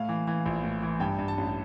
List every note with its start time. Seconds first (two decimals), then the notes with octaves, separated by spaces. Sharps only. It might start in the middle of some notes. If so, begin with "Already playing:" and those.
Already playing: A2 F5
0.09 E3
0.27 E3
0.46 A#1
0.63 A2
0.82 E3
1.00 G2 G5
1.19 G2
1.28 A5
1.38 A1